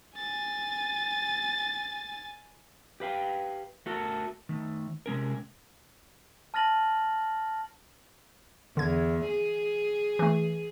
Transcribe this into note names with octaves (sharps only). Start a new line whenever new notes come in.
G#5 A6
G4 B4 F5 G5
A3 F#4 A4 A#4
D#3 A3
C3 G#3 C#4 A#4
A5 F6 A6 A#6 F#7
E2 D3 G#6
G#4
E3 A3